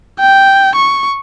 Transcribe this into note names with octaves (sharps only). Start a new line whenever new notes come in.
G5
C#6